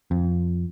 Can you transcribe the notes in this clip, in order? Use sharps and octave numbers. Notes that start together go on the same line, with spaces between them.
F2